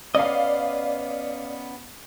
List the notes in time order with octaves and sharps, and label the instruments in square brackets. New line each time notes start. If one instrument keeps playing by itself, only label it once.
[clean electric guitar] B3 C#4 D#5 [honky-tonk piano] D5 F5